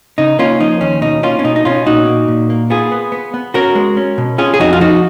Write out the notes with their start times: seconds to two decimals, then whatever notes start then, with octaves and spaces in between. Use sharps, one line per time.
0.18 C#3 D#4
0.39 A#3 C#4 F4
0.60 F3 D#4
0.81 D#2 C#4
1.02 B2 D#4
1.23 A#3 C#4 F4
1.39 C#4
1.44 B2 D#4
1.56 D#4
1.65 B2 C#4 F4
1.86 A#2 D#4 F#4
2.07 A#3
2.28 A#2
2.50 A#3
2.70 B3 F4 G#4
2.92 B3
3.12 B3
3.34 B3
3.54 C#4 F#4 A#4
3.75 G#3
3.97 C#4
4.18 B2
4.38 C#4 F4 G#4
4.54 G#4
4.60 F2 D#4 F#4
4.73 F4
4.80 F3 D#4 F#4